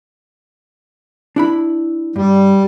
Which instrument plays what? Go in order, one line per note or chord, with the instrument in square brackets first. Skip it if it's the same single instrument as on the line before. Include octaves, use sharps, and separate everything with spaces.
[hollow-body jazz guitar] D4 E4 B5
[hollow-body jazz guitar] G2 [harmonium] G3